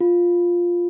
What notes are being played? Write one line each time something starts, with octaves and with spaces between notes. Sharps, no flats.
F4